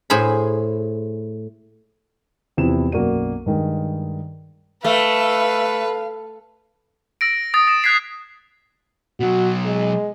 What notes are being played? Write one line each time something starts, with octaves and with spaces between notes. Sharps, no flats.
A2 G#4 C5 B5
E2 C3 F3 E4 E7
B1 F#2 A#3 F#4 D5 D#7
G2 D#3 G#3
A3 B4 F5
E6 A#6 D7
D#6 A6
D#6 A#6 E7
F#6 G#6 B6 C7 F7
B2 F#3 F#4
G#3